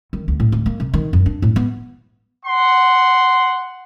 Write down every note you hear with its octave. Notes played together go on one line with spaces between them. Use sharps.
D#3
D2
A2
D2
A#3
C3
D#3
F#2
D4
A2
B3
F#5 C6